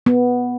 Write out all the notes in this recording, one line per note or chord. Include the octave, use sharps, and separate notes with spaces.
B3